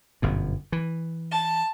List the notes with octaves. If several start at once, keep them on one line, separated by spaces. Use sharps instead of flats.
G1 F#2 B2
E3
A5